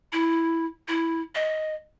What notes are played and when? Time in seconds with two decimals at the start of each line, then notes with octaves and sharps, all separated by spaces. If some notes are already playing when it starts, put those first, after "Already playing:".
0.13 E4
0.88 E4
1.35 D#5